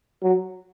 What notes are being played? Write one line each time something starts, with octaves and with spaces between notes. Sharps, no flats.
F#3